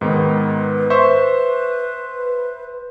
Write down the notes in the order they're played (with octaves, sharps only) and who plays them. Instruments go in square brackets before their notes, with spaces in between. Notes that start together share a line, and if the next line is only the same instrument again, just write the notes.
[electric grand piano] G#2 D#3 B3 [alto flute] B4
[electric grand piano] C5 E5 C#6